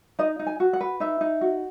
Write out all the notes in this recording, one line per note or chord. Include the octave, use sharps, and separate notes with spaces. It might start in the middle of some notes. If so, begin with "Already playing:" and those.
D#4 D#5
D#4
G#5
F#4
F#5
B4
D#4 E5
D#4
F#4